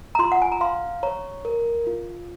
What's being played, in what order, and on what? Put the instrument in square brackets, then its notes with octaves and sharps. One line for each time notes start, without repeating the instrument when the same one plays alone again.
[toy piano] A#5
[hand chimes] F4 [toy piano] C6
[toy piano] F#5
G#5
A#5
[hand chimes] F5 [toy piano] C6
[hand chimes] C#5 [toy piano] A#5
[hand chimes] A#4
F4